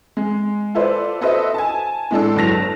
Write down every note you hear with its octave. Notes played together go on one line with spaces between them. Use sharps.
G#3
F4 A4 B4 C5 D5
F#4 A4 B4 C5 D#5 E5
G#5 A5
A2 G#3 D4 A4
G1 F#3 A5 A#6 F7